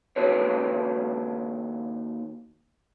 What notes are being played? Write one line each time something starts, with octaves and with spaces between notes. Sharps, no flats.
D#2 F4 F#4 A4 B4 C#5